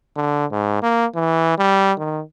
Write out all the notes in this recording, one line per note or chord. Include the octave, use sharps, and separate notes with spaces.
D3
G#2
A#3
E3
G3
D#3